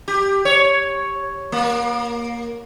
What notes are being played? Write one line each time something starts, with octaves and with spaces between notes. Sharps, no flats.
G4
C#5
A#3